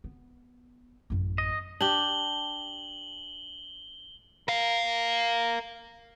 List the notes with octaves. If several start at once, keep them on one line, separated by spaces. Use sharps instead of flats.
B3
A1 F#2
D#5
D4 G4 F#7 G7
A#4 F5